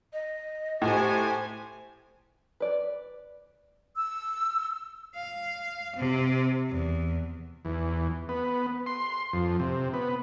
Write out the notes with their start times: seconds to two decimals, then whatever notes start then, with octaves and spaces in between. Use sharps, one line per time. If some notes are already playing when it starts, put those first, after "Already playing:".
0.13 D#5
0.82 A2 G4 C5 G#5
2.60 B4 D5
3.95 E6
5.15 F5
5.96 C3
6.70 E2
7.65 E2
8.29 B3
8.86 C6
9.33 F2
9.60 C3
9.94 B3